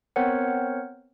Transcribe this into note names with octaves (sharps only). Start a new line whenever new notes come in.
B3 C4 A#4 C5 C#5 F#5